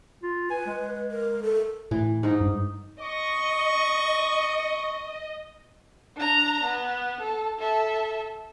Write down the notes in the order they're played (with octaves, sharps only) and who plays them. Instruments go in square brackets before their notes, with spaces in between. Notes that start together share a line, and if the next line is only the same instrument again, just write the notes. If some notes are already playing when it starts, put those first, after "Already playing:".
[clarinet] F4
[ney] B4 [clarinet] G#5
[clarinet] G#3
[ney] A#4
A4
[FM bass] A2 [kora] E3
[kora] G#2 D#4
[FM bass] G2
[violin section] D#5 [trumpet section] C#6
[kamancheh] D4 A#5
B3
A4
A4 E5